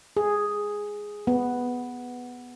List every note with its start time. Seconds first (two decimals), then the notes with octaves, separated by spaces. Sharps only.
0.17 G#4
1.27 B3